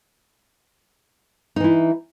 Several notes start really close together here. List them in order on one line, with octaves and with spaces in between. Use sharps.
D#4 E3 E4